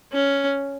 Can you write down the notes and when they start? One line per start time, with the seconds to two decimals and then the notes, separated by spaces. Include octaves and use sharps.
0.12 C#4